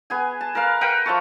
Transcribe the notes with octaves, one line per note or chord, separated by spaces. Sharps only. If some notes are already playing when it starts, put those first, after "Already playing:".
B3 G#4 G#5
A5
A#4 B4 F5
A#4 B4 F#5 G5
F3 E5 A5 C#6